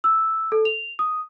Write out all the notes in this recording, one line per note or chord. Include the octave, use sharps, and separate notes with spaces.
E6
A4
F7
D#6